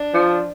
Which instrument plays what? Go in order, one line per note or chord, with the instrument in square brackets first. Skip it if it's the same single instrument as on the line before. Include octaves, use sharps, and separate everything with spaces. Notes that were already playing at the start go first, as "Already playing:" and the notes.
Already playing: [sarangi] D4
[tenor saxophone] F3